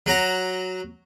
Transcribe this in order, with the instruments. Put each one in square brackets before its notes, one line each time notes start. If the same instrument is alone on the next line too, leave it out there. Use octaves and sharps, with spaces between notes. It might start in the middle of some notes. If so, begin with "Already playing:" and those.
[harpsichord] F#3 F#4 A#5